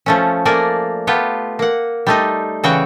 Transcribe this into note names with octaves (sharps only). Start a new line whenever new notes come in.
F3 A3 C#4
A3 A#3 A#4 D5 G#5
A3 B3 F4 G4
A#3 F#5
G3 A3 D#4
C#3 E3 F#4 C#5 G5